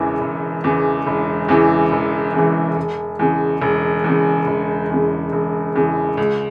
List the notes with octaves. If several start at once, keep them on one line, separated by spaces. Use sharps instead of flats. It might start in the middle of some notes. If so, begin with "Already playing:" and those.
Already playing: E1 E2 C#3 E3
E1
E2 C#3 E3
E1
E2 C#3 E3
E1
E2 C#3 E3
E1
E2 C#3
E1
E2 C#3
E1
E2 C#3
E1
E2 C#3
C#2